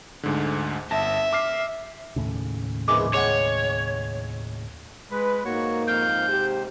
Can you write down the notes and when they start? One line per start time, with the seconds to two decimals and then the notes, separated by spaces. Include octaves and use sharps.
0.23 D2 G#2 D3
0.91 G1 E5 A5 A#6
1.33 D6 F6 C7
2.16 D#2 A2 C#3
2.88 A#1 E3 G#3 D6
3.14 G#3 C#5 F#5 G5
5.11 G#3 B4
5.45 G#2 A#3 F#4 C#5 C#6
5.87 F2 F5 G6
6.28 C3 G4 C5